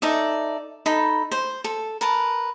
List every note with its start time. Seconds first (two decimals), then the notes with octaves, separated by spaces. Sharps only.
0.02 D#4 A4 D5 E5
0.86 D#4 A4 B5
1.31 C5
1.64 A4
2.01 A#4 B4 A5